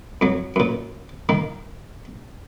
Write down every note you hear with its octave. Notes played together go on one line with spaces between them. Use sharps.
F2 F#3
F#2 A#2
D#3 A#3